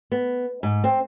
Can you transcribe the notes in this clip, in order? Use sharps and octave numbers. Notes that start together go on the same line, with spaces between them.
B3
G#2
C4